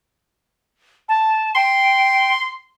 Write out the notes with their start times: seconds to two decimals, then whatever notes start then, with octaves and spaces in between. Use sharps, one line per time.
1.09 A5
1.55 G5 C6